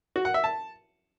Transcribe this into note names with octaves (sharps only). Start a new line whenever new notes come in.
F#4
F#5
E5
A5